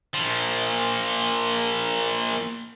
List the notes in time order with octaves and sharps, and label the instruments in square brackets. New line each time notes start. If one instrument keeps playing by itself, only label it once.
[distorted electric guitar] A#2 F3